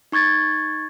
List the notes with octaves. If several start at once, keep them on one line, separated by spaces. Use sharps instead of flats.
D#4 C#6 G#6 A6